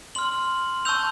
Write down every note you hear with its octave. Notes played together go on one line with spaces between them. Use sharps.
C6 F6 F#7
A5 C#6 E6 G6 F7